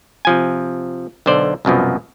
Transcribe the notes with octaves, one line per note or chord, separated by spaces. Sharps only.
C3 F3 G#5
B1 D3 C5 D5
C2 F#2 B2 F3